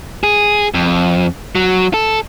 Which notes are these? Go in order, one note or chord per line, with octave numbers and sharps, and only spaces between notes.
G#4
F2
F#3
A4